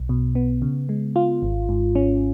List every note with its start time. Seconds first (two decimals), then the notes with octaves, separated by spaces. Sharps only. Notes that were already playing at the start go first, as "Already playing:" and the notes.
Already playing: B1
0.09 B2
0.35 B3
0.62 C#3
0.89 G#3
1.16 F4
1.42 G#1
1.69 G#2
1.95 C#4